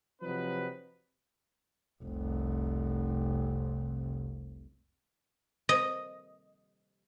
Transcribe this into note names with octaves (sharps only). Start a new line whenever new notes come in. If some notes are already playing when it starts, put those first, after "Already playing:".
C3 F3 F#3 C4 D#4 B4
F1 C2
D#5